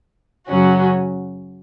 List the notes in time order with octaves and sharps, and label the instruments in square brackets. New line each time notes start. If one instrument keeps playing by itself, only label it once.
[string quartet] F#2 C#3 F#3 C#4 F#4